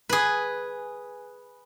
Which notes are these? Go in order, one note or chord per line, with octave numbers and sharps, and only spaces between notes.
G#4 B4